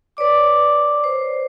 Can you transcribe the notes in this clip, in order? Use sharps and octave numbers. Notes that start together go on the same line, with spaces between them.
B4 C#5 D5 D6
C5